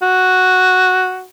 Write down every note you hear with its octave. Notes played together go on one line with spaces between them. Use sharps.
F#4